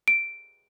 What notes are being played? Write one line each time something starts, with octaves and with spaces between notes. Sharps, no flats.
D7